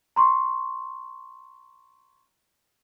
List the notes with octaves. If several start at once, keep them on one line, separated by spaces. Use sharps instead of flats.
A#5 C6 C#6